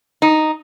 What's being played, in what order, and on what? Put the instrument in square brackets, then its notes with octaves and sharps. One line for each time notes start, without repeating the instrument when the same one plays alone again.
[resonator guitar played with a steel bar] D#4